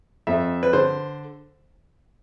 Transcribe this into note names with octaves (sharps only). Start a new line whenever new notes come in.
F2 E5
B4
D3 C5